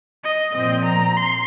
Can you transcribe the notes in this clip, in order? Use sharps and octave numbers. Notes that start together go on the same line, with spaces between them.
D#5
A#2 F3 C4 D#5
A#5
C6